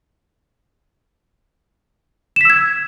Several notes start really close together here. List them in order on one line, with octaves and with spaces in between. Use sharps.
E7 B6 E6 G#6